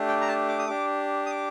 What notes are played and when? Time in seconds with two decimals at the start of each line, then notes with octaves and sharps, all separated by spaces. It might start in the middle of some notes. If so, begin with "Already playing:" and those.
Already playing: A3 D4 G4
0.08 G5
0.21 A#5
0.28 A5
0.49 D6
0.59 D#6
0.67 D4 G4 D6
1.26 D#6
1.30 D6